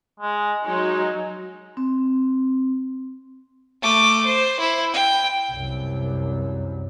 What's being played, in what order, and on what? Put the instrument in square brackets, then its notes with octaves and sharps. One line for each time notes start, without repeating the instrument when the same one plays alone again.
[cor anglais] G#3
[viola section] F#3 D#4 [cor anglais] G#3
[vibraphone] C4
[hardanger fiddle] A3 D6
C5
E4
G5
[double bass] C2 F#2